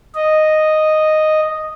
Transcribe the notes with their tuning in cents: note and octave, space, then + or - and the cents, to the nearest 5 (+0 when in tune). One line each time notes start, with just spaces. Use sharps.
D#5 -5